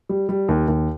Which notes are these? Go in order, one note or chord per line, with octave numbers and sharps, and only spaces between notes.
G3
G3
D#2
D#2